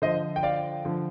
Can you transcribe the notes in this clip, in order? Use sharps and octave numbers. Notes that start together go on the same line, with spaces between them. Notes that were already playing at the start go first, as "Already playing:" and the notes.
D3 F3 C5 D#5
G5
D5 F5
D3 F3